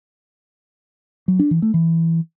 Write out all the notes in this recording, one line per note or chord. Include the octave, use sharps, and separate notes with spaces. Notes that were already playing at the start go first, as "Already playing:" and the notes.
F#3
D4
E3
A3
E3